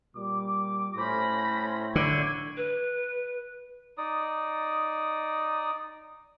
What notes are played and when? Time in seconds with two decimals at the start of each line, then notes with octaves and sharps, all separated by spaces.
0.16 A#2 G3 D6
0.97 A2 C#4 C5 B5 A#6
1.96 D3 E4 C#5 D5 G#6
2.57 B4
3.98 D#4 D5 D#6